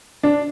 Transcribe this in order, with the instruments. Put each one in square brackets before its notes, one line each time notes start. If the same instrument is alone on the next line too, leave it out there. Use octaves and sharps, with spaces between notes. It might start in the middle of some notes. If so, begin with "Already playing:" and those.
[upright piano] D4